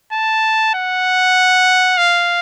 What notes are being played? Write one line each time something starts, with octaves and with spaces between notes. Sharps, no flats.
A5
F#5
F5